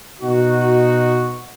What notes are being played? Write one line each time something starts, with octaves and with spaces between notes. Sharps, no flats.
B2 D#4 F#4